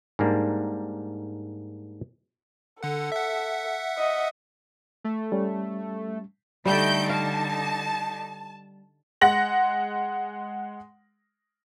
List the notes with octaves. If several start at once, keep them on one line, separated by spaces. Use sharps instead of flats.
G#2 G3 A#3 D4
D3 A4 F#5
E5 F#5
D#5
A3
G3 C#4
D3 G3 A3 D#4 G6 D7
F5 A5
G#3 F#5 A#6 F#7